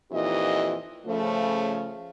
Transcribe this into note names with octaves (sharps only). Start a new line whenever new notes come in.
F2 A#2 E3 D#4 G4 D#5
C#3 F3 A3